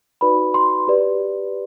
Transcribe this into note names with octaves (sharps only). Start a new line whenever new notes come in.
D#4 F#4 B4 D5 B5
C6
G4 B4 D5